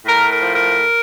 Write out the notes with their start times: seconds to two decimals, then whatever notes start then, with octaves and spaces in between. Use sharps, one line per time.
0.05 A2 A#4
0.30 A#4
0.41 F3
0.53 A#4